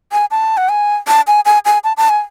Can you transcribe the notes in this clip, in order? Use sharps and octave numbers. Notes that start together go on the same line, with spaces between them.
G#5
A5
F#5
G#5
A5
G#5
G#5
G#5
A5
A5
G#5